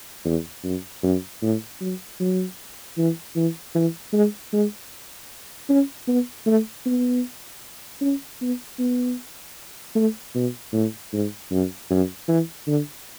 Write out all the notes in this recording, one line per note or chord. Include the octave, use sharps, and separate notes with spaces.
E2
F#2
F#2
A2
F#3
F#3
E3
E3
E3
G#3
G#3
C#4
B3
A3
B3
C#4
B3
B3
A3
B2
A2
G#2
F#2
F#2
E3
D3